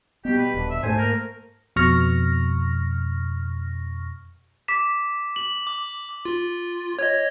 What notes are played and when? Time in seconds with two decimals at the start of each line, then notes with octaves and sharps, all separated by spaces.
0.25 B2 G3 B3 G4
0.37 B4
0.54 D#1 D3
0.70 E5
0.83 G#2 A3 C5 G#5
0.98 A#3 A#4
1.76 F2 B2 C#6 F6 A#6
4.68 D6 B6 E7
5.36 F#7
5.67 D6
6.25 F4
6.99 C#5 D#5 G#6